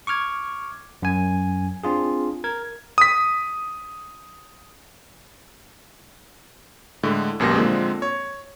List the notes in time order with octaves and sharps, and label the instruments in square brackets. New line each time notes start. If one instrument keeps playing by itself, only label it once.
[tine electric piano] C#6 D6 F6 G#6
F#2 G#5
C4 D4 F4 G#4
A#4 G#6
[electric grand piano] D#6 B6
A2 D3 G#3
G#1 F#2 B2 A#3 G4 A#6
A#2 D3 F3 G#3 A#3 C4
C#5